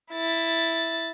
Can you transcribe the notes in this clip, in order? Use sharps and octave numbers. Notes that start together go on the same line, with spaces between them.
E4 A6